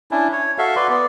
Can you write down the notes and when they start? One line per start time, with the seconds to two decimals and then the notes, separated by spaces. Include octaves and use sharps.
0.11 C#4 D4 E4
0.32 C#5
0.58 F#4 A4 E5 F5
0.76 B4 D5 C6
0.89 B3 D5